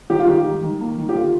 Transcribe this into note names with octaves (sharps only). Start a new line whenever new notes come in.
D#3 G4
F4
D#3 G4
D#3
D#3
A#3
D#3
G4
D3 F4